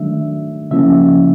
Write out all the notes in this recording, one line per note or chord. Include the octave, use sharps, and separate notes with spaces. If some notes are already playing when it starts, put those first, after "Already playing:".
Already playing: D#3 F#3 A3 D4 E5
C#3 F3 A#3 C#4 E4 E5